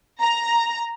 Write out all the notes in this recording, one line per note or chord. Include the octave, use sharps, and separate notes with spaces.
A#5